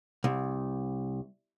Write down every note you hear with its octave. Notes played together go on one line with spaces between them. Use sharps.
C2